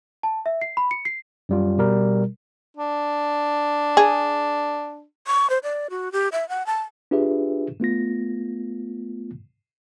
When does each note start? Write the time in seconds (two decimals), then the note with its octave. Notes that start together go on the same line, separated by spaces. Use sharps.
0.23 A5
0.46 E5
0.61 C7
0.77 B5
0.91 C#7
1.05 C7
1.49 F#2 G3 F4
1.78 B2 G3 A#4
2.76 D4
3.97 G#4
5.27 C#6
5.50 C5
5.63 D5
5.90 F#4
6.12 G4
6.32 E5
6.49 F#5
6.66 A5
7.11 D4 F4 G4 G#4 B4 E5
7.80 A3 B3 F4 A#6